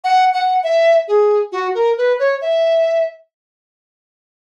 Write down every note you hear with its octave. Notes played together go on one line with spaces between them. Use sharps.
F#5
F#5
E5
G#4
F#4
A#4
B4
C#5
E5